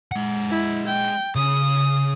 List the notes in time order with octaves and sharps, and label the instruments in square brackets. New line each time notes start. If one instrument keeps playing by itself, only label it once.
[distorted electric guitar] G#3 F#5
[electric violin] E4
G5
[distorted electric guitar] C#3 [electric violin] D#6